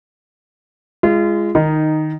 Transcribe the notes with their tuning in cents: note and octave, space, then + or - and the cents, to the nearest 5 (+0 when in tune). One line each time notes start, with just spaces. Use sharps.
G#3 -5 F4 -35
D#3 -10 D#4 +0